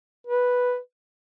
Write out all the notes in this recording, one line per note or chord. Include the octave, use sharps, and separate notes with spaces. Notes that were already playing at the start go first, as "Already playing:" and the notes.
B4